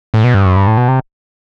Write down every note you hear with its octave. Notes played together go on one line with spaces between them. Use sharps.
A2
B2
G2
F#2
G2
A2
B2
C3